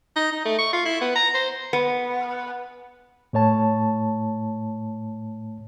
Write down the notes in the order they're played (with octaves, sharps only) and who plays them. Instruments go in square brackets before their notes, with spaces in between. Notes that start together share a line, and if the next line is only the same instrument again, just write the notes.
[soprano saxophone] D#4
D#4
A3
C#6
F4
E4
B3
A#5
C5
[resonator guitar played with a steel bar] B3
[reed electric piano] A2 A3 C#5 A5